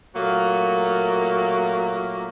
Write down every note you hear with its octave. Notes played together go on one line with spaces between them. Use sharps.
A#2 F#3 A3 A#3